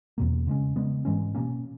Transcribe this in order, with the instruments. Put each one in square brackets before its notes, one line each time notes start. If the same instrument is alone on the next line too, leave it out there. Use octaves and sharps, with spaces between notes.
[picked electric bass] E2 B2 A#3
C#3 G#3 C#4
C#3 G#3 B3
G#2 E3 G#3 C#4
B2 A#3 C#4